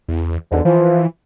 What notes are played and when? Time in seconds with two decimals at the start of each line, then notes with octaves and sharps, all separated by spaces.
0.08 E2
0.52 E2 G#2 B2 D3
0.65 E3 F3